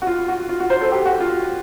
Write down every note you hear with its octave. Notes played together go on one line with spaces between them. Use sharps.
F#4
F4
F#4
F4
F#4
C5
A4
G4
F#4
F4